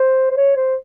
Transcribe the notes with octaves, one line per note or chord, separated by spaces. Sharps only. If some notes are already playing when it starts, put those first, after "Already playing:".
Already playing: C5
C5
C#5
C5